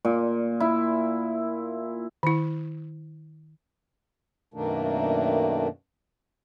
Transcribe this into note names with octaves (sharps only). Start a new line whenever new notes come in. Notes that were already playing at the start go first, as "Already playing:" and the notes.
A#2
E4
D#3 E4
F#2 B2 D#3 A3 A#3 D4